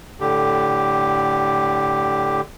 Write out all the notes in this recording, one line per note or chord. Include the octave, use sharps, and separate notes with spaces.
A2 D3 G4